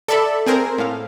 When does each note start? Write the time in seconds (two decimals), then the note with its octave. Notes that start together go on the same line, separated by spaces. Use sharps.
0.08 A4 D5 E5 A5 B5
0.46 C4 G#4 A#4 C5
0.78 A2 F5